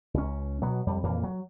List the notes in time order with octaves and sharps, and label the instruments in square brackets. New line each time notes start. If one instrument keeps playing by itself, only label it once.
[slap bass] C#2 C#4
B2 F#3 B3
F2 G3
F2 A#2 E3 A#3
F#3